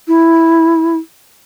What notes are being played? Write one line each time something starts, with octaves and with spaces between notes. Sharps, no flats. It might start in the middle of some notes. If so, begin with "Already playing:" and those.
E4